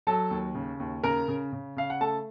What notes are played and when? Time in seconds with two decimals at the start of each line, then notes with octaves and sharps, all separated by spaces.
0.07 F#3 A4 A5
0.30 D#2
0.55 C#3
0.80 D#2
1.04 C#3 A#4 A#5
1.28 C#3
1.52 C#3
1.76 C#3 F5
1.90 F#5
2.01 A3 A4 A5